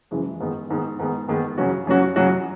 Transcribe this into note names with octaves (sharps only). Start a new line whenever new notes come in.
F#1 F#2 E3 G#3
G#2 D#3 G#3 B3
G#2 D#3 G#3 B3
G#2 D#3 G#3 B3
G#2 D#3 G#3 B3
F#2 C#3 F#3 C#4 F#4
F#2 C#3 F#3 C#4 F#4
F#2 C#3 F#3 C#4 F#4